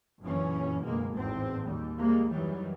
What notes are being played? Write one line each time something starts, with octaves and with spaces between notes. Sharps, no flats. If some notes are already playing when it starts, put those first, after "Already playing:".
F#1 F#2 A#2 D3 E3 C#4
F#1 D2 B2 G#3 A#3
G#1 E2 A2 C4
D#2 G3
C3 G3 G#3 A#3
F#2 D#3 E3 F#3 G3